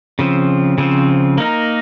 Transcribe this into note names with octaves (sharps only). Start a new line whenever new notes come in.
C#3 F3 C4
C#3 F3 C4
A#3 D#4 A#4